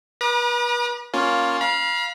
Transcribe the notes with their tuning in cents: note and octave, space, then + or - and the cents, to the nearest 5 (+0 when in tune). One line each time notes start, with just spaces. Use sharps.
B4 -35 A#5 +45 D6 +45
A#3 +0 C#4 +0 F4 +10
F5 +0 B5 -45